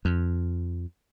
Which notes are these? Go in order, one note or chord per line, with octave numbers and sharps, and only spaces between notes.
F2